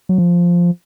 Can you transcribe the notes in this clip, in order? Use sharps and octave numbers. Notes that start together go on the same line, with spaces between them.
F#3
F3